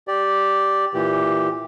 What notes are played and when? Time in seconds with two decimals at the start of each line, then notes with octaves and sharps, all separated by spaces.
0.08 G4 D5
0.94 A#2 E3 G4